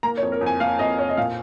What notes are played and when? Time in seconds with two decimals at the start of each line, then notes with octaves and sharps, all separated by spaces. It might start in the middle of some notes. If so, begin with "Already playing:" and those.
0.03 A#3 A#5
0.17 C#5
0.22 F2
0.32 A#4
0.41 F2
0.46 G#5
0.60 A#3 F5
0.79 F2 D#5
0.98 F2 C#5
1.09 D#5
1.17 A#2 F5